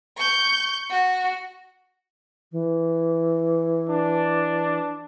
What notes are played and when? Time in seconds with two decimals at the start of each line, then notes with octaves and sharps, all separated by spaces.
0.17 C#6 G6
0.90 F#4
2.52 E3
3.90 D4